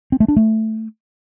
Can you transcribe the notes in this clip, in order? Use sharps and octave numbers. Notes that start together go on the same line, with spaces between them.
C4
A3
D4
A3